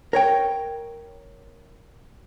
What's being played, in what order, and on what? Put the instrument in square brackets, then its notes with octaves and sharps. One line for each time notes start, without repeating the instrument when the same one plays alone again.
[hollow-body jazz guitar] A#4 C#5 G5